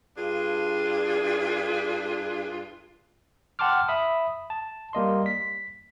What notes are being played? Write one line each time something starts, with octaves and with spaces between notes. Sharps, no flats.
G2 D4 F4 G#4
F#5 G5 A5 C6 D6 F6
E5 B5 D#6
A5
G3 A#3 D#5 C6
B6